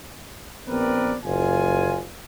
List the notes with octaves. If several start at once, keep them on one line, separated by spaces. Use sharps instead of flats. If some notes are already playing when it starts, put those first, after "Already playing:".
A#1 B3 C4 A#4 B4 D5
F#1 F4 G#5